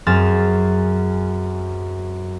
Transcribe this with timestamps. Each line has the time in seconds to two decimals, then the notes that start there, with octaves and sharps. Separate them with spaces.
0.06 F#2 C4 G#4 F6 A6 E7